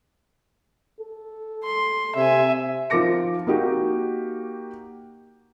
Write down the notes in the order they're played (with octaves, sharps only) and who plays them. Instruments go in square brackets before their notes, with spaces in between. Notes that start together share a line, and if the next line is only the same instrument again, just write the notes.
[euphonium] A4
[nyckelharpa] C6
[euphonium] C3 [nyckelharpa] E5 G#5
[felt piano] F3 D#4 A#4 D6 A#6 C#7
A#3 D#4 F#4 G4